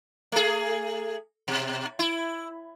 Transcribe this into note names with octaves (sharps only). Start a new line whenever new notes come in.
A3 G#4
B2
E4